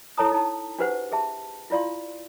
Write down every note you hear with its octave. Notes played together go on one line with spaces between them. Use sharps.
E4 A4 C#5 A5 A#5 D#6
D#4 A5
D4 F#4 G4 B4 C5 F#5
G4 G#4 E5 A5
E4 F4 D5 F5 C6